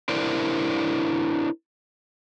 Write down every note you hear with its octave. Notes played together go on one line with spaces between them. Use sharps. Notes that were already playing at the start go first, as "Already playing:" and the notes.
D4 E4 A#4 C5 D5